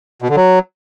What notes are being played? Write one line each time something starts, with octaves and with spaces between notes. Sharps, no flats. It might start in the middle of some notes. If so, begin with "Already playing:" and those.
B2
D3
F#3